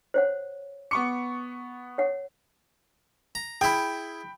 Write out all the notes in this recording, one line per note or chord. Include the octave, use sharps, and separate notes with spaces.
C5 C#5 F#5
B3 C#6 D6 C#7
C#5 F#5
A#5
E4 G#4 G5 B5